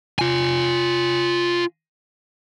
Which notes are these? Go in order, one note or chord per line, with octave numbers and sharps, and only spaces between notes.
F4 G#5